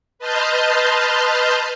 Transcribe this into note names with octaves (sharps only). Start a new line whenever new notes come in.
B4 D#5 A5 C6 F6 G6